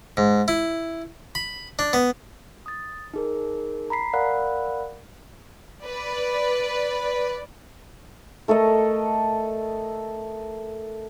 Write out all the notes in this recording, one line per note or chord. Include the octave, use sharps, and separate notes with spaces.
G#2
E4
B5
D4
B3
D#6 A6
D#4 G#4 A#4
A#5 B5 B6 C7
A#4 D5 F5 F#5 B5 F#6
B4 D5
A3 A4 A#4 D#5